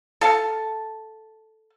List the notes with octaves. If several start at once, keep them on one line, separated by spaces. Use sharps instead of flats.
A4 F5 A5